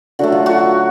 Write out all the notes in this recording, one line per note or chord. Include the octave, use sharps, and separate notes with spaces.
D3 F#3 A3 F#4
F4
F#4